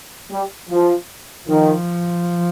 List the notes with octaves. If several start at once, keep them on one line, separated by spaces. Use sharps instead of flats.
G3
F3
D#3 F3